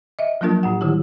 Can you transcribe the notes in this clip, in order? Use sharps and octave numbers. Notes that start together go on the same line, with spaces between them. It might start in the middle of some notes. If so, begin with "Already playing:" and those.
D#5 E5
F3 F#3 A#3 D4 F4 A#4
A2 F4 F#5
D3 D#3 G3 E4 G4